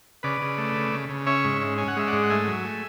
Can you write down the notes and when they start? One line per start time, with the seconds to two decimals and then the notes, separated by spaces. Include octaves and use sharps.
0.23 C#3 B4 D5
0.41 C#3
0.58 A3
0.76 C#3
0.92 C#3
1.09 C#3
1.26 C#4 C#5 E5
1.44 G#2
1.61 C#4
1.78 C#4 G#5
1.88 F#5
1.96 G#3 E5
2.08 G#2 D5 F#5
2.23 F#5
2.30 A3 E5 G#5
2.47 F#3
2.65 A3